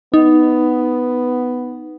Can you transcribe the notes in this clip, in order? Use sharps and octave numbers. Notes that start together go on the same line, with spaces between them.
B3 D#4